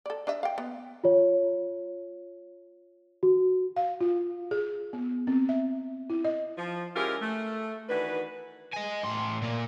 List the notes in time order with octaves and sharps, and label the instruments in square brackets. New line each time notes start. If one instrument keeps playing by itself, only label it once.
[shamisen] A4 D5
D4 D#5 E5
F5 G5
B3
[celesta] F4 C#5
F#4
[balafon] F5
F4
G#4
B3
C4
E5
E4
D#5
[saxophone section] F3
G#3 C#4 E4 F4 G4 A#4
A3
D#3 E3 D4 F#4 B4
[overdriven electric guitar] D#5 G#5
A2 C6
A#2 A#3